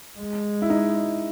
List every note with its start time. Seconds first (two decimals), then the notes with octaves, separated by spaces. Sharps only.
0.19 G#3
0.62 E4
0.70 D#4